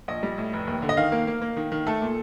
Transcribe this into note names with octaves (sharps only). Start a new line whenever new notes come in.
A#1 D#5
G3
A2
F1
D#2
D3
D#5
D#3 F5
A#3
A#3
A#3
D#3
D#3
A3 A4
A#2